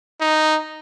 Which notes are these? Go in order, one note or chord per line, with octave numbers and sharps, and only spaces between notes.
D#4